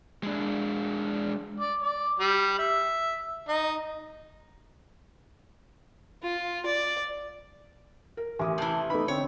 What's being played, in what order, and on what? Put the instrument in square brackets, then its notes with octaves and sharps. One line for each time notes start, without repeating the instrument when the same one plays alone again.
[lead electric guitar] G#3 D4
[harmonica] D5
D5
G3
E5
D#4
[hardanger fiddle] F4
D5
[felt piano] A#4
[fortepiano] A1 [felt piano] G#5 D6 D#6
[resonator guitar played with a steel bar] C3 E3 [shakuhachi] A5
[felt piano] A3 B4 [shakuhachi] D#4 [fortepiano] B5
[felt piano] D3 [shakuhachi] C4 [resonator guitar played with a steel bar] C#5